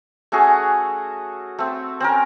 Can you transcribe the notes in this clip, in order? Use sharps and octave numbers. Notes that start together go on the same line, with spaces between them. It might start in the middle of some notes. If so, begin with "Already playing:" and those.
A3 C#4 F#4 G#4
A3 C4
C4 C#4 A#4